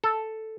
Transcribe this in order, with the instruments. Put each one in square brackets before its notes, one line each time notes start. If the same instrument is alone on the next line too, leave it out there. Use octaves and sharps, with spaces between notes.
[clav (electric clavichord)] A4